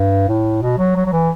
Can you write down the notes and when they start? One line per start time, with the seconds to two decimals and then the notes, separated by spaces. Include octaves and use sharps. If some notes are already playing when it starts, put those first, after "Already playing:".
Already playing: G2
0.28 A2
0.62 B2
0.78 F#3
0.96 F#3
1.06 F#3
1.12 E3